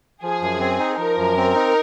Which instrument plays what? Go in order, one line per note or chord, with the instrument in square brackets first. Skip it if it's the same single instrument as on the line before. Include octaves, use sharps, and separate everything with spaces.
[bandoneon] F3 [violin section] G#4
[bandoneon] F#2
C4
D#4
[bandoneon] F3 [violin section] A#4
[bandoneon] F#2
C4
D#4